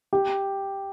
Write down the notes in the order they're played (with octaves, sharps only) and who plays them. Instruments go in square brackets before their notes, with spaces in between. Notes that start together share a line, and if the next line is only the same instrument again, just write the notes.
[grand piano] G4